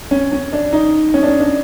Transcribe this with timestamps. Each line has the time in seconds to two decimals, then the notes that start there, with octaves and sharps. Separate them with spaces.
0.11 C#4
0.32 C#4
0.53 D4
0.73 D#4
1.14 C#4
1.23 D4
1.27 C#4
1.40 D4